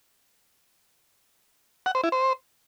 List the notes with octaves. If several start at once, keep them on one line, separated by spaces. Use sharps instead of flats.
F#5
C5
E4
C5